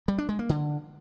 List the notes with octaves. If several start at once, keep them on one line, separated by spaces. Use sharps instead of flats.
G3
D4
G#3
A#3
D3